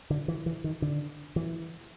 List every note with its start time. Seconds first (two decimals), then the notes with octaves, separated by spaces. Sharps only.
0.10 D3
0.28 E3
0.46 E3
0.64 D#3
0.82 D3
1.36 E3